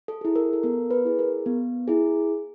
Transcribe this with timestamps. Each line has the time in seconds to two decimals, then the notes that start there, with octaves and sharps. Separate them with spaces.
0.08 A4
0.21 E4 G#4
0.36 A#4
0.53 A4
0.63 B3 A#4
0.91 B4
1.05 E4 G#4
1.19 A#4
1.46 B3
1.88 E4 G#4